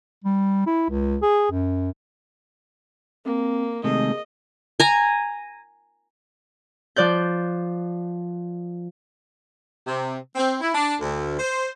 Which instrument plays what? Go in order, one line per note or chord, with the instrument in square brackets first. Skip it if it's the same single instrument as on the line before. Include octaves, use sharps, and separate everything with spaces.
[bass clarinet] G3
E4
C#2
G#4
F#2
[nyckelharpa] A#3 [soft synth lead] C4
[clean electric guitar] C3 [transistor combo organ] D#3 G#3 A3 [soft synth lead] G#4 [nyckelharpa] D#5
[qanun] G#5 A#5
[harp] F3 D5 F#6 G6
[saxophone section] C3
C4
E4
D4
D2
C5